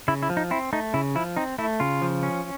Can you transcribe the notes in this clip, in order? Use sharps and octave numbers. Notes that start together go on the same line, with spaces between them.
C#3 E4
E4
F3
D#4
C4 E4
A3 D#4
C#3 E4
F3 E4
C4 D#4
A3 E4
C#3 F4
F3
C#4